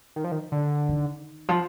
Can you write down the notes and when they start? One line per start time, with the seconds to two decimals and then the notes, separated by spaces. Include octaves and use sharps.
0.16 D#3
0.24 F3
0.32 D#3
0.52 D3
0.89 D#3
1.49 F3